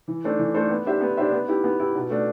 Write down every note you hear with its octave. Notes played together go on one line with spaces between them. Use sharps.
E3
A3 D4 A4 C5
E3
A3 D4 A4 C5
B3
D4 G4 C5 E5
B3
D4 G4 C5 E5
B3
E4 G4
B3
E4 G4
B2
A3 D4